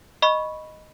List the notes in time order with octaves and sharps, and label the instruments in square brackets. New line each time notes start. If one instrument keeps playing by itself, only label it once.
[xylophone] D#5 B5 C#6